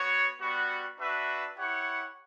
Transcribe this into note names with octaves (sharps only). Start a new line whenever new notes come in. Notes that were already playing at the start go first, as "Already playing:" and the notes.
Already playing: B3 F#4 C#5
G3 B3 F#4
D4 F#4 B4 E5
E4 G4 C#5 F#5